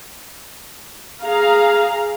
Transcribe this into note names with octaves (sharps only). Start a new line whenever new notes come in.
G#4 F5 A#5